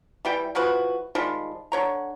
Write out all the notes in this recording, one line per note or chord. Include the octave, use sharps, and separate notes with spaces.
E3 G3 G5
E3 F3 F#4 B4
D#3 F3 G3 G#3
D3 C#5 A#5